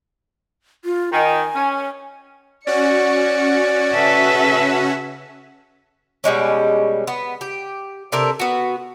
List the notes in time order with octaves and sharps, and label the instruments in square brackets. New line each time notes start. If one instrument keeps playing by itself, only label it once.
[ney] F4
[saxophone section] D#3 [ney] G#5
[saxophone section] C#4
[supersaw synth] C#4 F#4 [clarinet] D5 [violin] C#7
[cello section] C#3 E5 [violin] A4 B4
[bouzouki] B2 G3 G#3 C#4
B3
G4
C3 D4 A4 A#4
B3 F#4